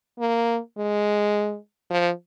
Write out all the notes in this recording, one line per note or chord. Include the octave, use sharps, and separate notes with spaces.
A#3
G#3
F3